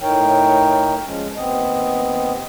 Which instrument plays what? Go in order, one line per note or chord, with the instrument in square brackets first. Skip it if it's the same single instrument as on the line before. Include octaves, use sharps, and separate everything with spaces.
[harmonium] A2 D#4 A#4 C#5 G5
F3 G#3 C#4
D#2 B3 C4 D#5